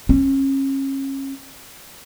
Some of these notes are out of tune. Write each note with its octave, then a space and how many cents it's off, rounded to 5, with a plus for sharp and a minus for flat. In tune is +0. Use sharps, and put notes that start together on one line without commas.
C#4 -35